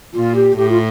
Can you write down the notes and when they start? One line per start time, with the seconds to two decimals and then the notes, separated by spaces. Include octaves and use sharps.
0.13 A#2 F4
0.35 G4
0.57 A2 G4
0.69 F4